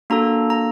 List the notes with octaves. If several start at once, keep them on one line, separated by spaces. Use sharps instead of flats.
A#3 D4 F#4 A4 A#5
A#5